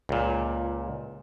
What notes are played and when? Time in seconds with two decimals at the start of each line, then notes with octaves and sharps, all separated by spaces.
0.09 C#2 A#2